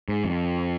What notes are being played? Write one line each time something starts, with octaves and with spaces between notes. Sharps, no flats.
G#2
F2